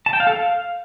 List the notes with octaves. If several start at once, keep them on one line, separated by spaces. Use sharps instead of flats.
A5
G5
F5
A4
F5